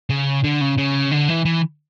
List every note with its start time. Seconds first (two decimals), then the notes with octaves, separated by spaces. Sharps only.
0.10 C#3
0.44 D3
0.61 C#3
0.78 C#3
1.12 D3
1.28 E3
1.45 E3